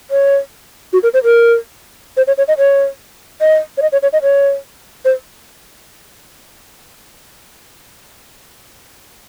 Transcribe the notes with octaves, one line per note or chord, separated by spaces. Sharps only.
C#5
F#4
A#4
C5
A#4
C5
C#5
C#5
D#5
C#5
D#5
C#5
D#5
C#5
C#5
D#5
C#5
C5